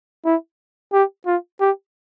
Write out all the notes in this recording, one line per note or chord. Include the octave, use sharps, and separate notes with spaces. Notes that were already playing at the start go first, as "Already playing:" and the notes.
E4
G4
F4
G4